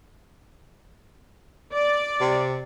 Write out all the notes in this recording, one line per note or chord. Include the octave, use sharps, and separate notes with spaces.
D5
C3